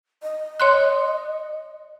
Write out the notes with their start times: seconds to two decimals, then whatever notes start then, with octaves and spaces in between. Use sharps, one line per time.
0.23 D#5
0.60 C#5 C6 F#6